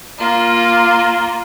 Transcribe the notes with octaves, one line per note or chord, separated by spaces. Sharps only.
A#3 F4